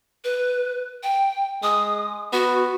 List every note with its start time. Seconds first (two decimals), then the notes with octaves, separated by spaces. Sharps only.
0.24 B4
1.03 G5
1.63 G#3 D#6
2.33 B3 F#4